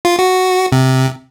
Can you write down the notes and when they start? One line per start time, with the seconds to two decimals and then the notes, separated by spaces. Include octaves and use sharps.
0.05 F4
0.19 F#4
0.72 C3